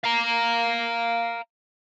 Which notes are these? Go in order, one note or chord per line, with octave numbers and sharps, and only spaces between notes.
F5 A#5